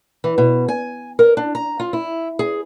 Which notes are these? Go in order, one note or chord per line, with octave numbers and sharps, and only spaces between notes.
E3
B2
G#5
A#4
D4
A#5
F4
E4
G#4